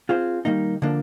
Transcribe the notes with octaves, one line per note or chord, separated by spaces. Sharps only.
C4 F4 G#4 C5
D#3 G3 A#3 D#4
D3 F3 A#3 D4